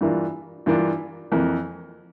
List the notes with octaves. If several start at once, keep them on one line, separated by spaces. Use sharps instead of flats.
G2 E3 A#3 D4 F4
G2 E3 A#3 D4 F4
F2 E3 A#3